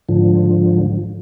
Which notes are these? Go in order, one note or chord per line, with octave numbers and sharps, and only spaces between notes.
G#2 D3 F3